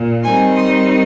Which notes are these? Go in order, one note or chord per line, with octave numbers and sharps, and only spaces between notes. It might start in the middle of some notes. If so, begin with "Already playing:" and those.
Already playing: A#2
D#3 G3 C4 D#4 G#5 C6
C6 D#6